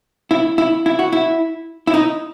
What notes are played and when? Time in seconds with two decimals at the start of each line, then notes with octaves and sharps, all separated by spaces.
0.31 E4
0.58 E4
0.86 E4
0.99 F#4
1.13 E4
1.87 E4
1.94 D#4